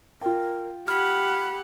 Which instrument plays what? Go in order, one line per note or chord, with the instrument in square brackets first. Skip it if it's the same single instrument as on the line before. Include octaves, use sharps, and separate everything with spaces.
[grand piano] F4 G5 [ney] A#4
[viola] G4 F#5 [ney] B5 [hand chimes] F6